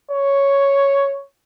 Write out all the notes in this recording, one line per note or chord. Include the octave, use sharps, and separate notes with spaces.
C#5